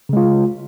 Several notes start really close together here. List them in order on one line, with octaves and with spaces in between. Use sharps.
C#3 G#3 F4